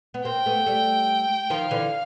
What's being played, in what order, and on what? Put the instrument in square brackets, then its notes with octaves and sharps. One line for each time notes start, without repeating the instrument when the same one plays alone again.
[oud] B3
[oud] A#3 C4 [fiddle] G5
[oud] A3 B3
G3 A3
[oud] D#3 F3 [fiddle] F5
[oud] D3 E3